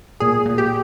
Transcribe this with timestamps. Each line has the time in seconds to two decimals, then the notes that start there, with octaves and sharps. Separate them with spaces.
0.20 A#2 G#4
0.46 A#2
0.58 G4